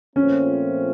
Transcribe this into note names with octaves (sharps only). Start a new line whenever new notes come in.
A#2 F3 A3 C4 C#4